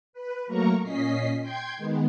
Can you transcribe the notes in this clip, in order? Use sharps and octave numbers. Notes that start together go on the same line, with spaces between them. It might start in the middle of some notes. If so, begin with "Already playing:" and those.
B4
F#3 A3 A#3 A#4 A#5 C#6
A#2 C#4 D#5 B6 C7
G5 C6 G6 G#6
D#3 G#3 B3